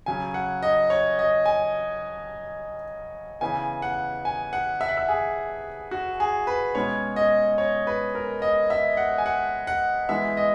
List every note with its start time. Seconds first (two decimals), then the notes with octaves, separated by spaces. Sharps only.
0.06 C#3 F#3 C#4 G#5
0.34 F#5
0.63 D#5
0.90 C#5
1.19 D#5
1.46 G#5
3.41 C#3 E3 B3 G#5
3.82 F#5
4.25 G#5
4.53 F#5
4.81 E5
4.89 F#5
4.97 E5
5.08 G#4
5.91 F#4
6.20 G#4
6.47 B4
6.75 B2 G#3 C#4 C#5
7.16 D#5
7.58 C#5
7.87 B4
8.15 A#4
8.42 D#5
8.70 E5
8.97 F#5
9.18 G#5
9.26 F#5
9.67 F#5
10.09 E3 G#3 B3 E5
10.37 D#5